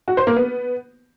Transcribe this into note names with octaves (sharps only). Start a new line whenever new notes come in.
F#4
C5
A#3
B3